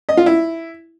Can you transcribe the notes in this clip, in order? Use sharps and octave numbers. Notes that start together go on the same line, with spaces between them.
D#5
F4
E4